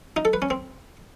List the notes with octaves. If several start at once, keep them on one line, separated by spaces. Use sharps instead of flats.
D#4
A4
B4
C#4
C4